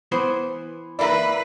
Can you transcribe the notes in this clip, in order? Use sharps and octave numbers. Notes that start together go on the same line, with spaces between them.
E3 B3 C5
A#3 E4 B4 D5 E5